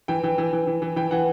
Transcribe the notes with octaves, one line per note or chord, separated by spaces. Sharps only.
E3 G5
E3
E3
E3
E3
E3
E3 G5
E3 F#5